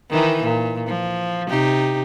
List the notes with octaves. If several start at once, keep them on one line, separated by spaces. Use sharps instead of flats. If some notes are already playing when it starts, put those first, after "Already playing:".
D#3 E3 D#4
A#2
F3
C3 D#4 G4